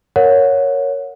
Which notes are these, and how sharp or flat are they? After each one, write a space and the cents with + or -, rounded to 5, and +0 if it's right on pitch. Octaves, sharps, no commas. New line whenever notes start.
A#4 +0 C#5 +0 F#5 -35